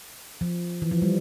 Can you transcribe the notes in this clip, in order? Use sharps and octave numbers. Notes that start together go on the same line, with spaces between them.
F3
E3
F3
G3